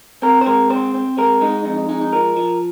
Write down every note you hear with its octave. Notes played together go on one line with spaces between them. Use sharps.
C4 A#4
C5
G#3 A#4
C4 C5
C4
G#3 A#4
G#3 D#4
F2 D#4
D#4
G#3 D#4
D#4
F3 A#4
F3